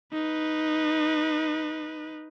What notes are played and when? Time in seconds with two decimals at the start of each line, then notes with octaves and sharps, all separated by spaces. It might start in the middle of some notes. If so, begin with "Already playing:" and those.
0.13 D#4 B4